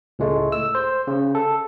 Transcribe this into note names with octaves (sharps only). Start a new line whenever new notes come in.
C#2 A2 G#3 A3
E6
C5
C#3
A4